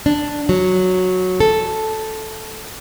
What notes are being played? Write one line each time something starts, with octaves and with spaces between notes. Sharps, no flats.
D4
F#3
A4